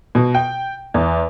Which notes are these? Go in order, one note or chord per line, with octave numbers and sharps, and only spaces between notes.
B2
G5
E2